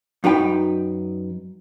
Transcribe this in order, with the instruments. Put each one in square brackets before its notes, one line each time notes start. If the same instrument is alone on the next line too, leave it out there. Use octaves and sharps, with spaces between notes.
[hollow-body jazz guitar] F#2 D#4 B4 G5